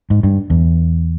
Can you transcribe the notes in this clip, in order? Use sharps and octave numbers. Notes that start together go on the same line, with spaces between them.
G#2
G2
E2